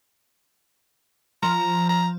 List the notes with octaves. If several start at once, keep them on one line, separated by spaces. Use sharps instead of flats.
F3 A#5
A#5